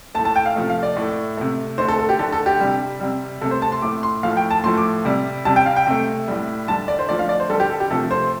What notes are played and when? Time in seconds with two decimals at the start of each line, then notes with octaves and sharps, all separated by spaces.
0.15 A3 A5
0.19 A2
0.25 A5
0.36 G5
0.46 F5
0.56 C3 F3 A3
0.70 F5
0.83 D5
0.96 A2 A3
1.37 C3 A3
1.78 D3 A3 C5
1.88 A4
1.99 A4
2.09 G4
2.19 D3 A3 A4
2.32 A4
2.46 G4
2.60 C3 G3
3.00 C3 G3
3.41 C3 A3 A4
3.51 C5
3.62 A5
3.72 C6
3.82 A2 A3 D6
4.03 C6
4.23 A2 F3 A3 F5
4.37 G5
4.51 A5
4.64 A2 F3 A3 C6
4.77 D6
5.05 C3 G3
5.45 C3 G3 A5
5.56 G5
5.66 F5
5.76 G5
5.87 C3 A3
6.28 A2 G3
6.68 D3 G3 A5
6.88 D5
6.99 C5
7.09 D3 F3 A3 D5
7.19 F5
7.29 D5
7.40 C5
7.50 D3 G3 A4
7.60 G4
7.69 A4
7.80 G4
7.91 C3 F3 A3 A4
8.11 C5